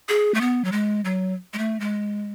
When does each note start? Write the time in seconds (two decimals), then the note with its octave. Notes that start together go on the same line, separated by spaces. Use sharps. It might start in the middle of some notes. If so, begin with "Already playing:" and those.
0.09 G#4
0.34 A3
0.41 B3
0.65 F#3
0.72 G#3
1.05 F#3
1.53 G#3
1.58 A3
1.80 G#3